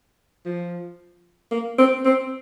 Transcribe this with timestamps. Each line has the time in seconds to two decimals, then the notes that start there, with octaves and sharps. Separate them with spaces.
0.45 F3
1.51 A#3
1.78 C4
2.05 C4